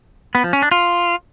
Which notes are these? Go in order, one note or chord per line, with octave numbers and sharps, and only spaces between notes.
B3
F3
C#4
D4
F4